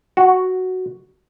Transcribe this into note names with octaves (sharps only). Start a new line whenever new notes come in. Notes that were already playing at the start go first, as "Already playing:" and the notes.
F#4